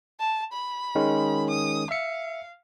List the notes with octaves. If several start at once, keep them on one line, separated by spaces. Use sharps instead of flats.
A5
B5
D#3 G#3 C#4
D#6
E5 F5 C#7